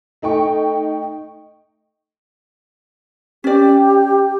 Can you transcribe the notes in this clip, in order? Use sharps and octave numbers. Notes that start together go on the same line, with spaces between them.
A3 D#4 G5 C#6
C#4 G4 D5